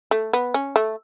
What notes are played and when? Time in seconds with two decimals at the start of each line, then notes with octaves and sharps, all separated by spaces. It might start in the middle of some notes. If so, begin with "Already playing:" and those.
0.11 A3
0.33 B3
0.54 C#4
0.76 A3